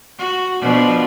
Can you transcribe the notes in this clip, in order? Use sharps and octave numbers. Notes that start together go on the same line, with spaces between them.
F#4
B2 F3 D4